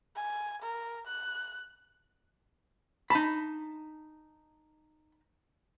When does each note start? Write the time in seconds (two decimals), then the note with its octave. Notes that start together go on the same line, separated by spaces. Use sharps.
0.16 G#5
0.63 A#4
1.08 F#6
3.10 D#4 A5 B5